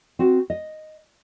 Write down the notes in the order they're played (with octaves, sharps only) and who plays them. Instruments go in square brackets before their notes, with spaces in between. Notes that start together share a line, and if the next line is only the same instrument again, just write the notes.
[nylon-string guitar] C4 F#4
D#5